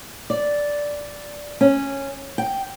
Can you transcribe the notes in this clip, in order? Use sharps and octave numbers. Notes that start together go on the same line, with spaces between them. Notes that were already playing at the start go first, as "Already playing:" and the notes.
D5
C#4
G5